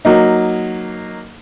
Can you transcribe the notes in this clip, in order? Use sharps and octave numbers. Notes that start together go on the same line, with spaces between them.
F#3 A#3 D#4